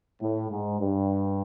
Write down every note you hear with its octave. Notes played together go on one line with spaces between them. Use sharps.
A2
G#2
G2